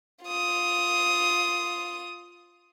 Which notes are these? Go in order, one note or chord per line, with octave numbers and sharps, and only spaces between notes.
F4 D#6